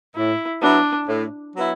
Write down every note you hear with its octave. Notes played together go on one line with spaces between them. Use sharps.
A2 E4
F#3 B3 D4 E4
A2
F#3 B3 E4